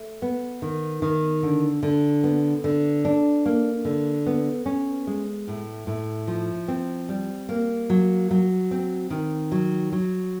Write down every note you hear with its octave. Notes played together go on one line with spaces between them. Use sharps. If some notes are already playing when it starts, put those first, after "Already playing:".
Already playing: A3
B3
D#3
D#3
D3
D3
B3
D3
D4
A#3
D3
B3
C#4
G#3
A2
A2
F3
C4
G3
A#3
F#3
F#3
C4
D#3
F#3
F#3